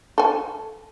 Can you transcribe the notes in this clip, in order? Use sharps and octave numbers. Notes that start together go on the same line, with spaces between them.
A4 G#5